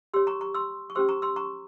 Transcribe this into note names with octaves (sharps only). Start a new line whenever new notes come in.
G4 C#5 C6 E6
A#5 C#6
A#5 C#6
C6 E6
C#6
C#4 G4 C5 C6 E6
A#5 C#6
C6 E6
A#5 C#6